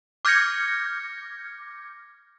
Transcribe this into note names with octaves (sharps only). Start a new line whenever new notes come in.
D6 F6 G6 G#6 A#6 C#7